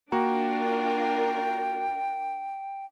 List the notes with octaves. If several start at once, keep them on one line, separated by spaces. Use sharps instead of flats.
A#3 D4 F4 F#4 A#4 G5 A#5